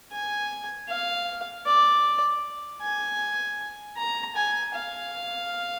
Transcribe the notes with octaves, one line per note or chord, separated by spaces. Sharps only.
G#5
F5
D5
G#5
A#5
G#5
F5